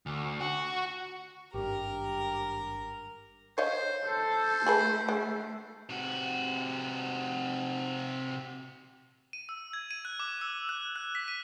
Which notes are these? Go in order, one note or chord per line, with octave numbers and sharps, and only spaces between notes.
D2
F#4
G#1 G2 G4 A#4
C5 C#5 D#5 F5
A4 C5
A3 G#4 A4 B4
G#3
C3 F#4
D#7
E6
G#6
D#7
F#6
D6
E6
F#6
F#6
B6
D#7